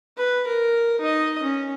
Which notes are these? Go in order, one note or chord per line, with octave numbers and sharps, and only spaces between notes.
B4
A#4
D#4 D#5
C#4